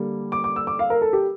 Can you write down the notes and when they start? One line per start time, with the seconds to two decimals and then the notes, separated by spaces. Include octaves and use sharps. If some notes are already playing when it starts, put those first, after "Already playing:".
Already playing: D3 G3 A#3
0.32 D6
0.44 D6
0.56 E6
0.67 D6
0.79 F5
0.90 A#4
1.02 A4
1.13 G4